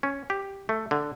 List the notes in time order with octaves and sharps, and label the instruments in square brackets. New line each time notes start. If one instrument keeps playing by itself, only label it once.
[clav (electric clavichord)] C#4
G4
A3
D3